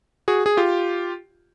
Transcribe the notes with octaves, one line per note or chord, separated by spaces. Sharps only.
F#4 G#4
G#4
F4 G4